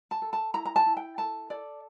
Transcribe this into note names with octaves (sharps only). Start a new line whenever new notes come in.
A5
A4
A5
E4 A#5
A#5
A5
E4
G5
A4 A5
A4 D5